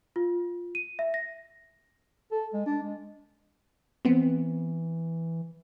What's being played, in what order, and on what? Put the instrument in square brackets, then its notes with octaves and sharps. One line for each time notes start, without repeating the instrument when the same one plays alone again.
[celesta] F4
D#7
E5
A#6
[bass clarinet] A4
G#3
D4
G#3
[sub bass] E3 [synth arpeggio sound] B3 C4